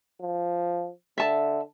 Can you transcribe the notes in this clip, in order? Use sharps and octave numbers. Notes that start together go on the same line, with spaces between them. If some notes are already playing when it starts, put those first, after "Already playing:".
F3
D3 E5 A5